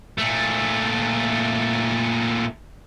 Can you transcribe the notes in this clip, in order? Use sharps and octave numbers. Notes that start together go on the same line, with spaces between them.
A#2 A3